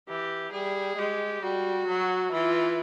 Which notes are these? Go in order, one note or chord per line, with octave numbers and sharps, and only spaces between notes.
E3 G4
G3 G#4
G#3 G4
G3 F#4
F#3
E3 F4